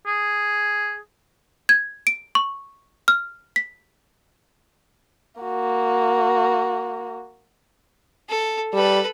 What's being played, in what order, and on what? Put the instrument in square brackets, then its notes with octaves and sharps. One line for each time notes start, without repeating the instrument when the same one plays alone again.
[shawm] G#4
[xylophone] G#6
D7
C#6
F6
B6
[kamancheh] A#3 F#4
[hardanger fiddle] A4
[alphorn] G3 [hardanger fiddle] A4 B4